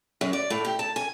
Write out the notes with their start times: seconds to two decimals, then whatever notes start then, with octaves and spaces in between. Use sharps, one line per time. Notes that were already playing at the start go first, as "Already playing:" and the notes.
0.21 F#2
0.33 D5
0.50 A2
0.65 G4
0.79 A5
0.96 G#5